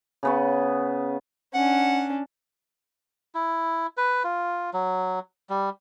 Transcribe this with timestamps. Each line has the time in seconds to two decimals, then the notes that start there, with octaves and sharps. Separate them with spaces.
0.23 C#3 B3 C#6
1.55 C#4 D4 F#5
3.35 E4
3.97 B4
4.24 F4
4.74 F#3
5.49 G3